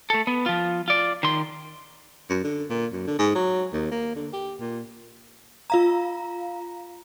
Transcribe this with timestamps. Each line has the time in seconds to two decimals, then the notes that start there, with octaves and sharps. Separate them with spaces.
0.10 A3 A4
0.27 B3
0.46 F3 F4
0.88 F4 D5
1.23 D#3 C6
2.30 F#2
2.44 D3
2.70 A#2
2.92 F#2
3.07 D3
3.19 G#2
3.35 F#3
3.73 D#2
3.92 A#3
4.15 D3
4.33 G4
4.60 A#2
5.70 F4 F5 A#5